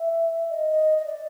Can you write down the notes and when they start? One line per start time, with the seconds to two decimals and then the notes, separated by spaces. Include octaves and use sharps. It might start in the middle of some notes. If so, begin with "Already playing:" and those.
Already playing: E5
0.50 D#5
0.98 D#5
1.06 D5